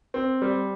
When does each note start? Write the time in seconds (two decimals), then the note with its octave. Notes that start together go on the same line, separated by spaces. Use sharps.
0.14 C4
0.42 G3